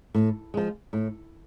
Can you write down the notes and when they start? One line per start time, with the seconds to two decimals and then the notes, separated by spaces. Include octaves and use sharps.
0.14 A2
0.54 F3 G#3
0.93 A2